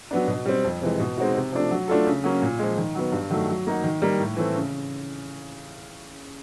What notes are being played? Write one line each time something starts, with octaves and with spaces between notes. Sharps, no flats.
F#3 B3 D4
B2
G3 C4
F2
C3 E3 G#3
B2
G#3 C4 D#4 F#4
C3
F3 A3 D4
F#3
A3 D4 F4 A4
C#3
F#3 A#3 C#4
A#2
F3 G#3
D#3
F#3 B3
G2
D#3 F#3 A3
F#3
A#3 D#4 F#4
D#3
G3 A#3 D#4
A2
E3 A3 C4
C#3